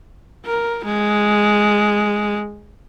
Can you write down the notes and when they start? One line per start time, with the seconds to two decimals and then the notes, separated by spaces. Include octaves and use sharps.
0.45 A#4
0.85 G#3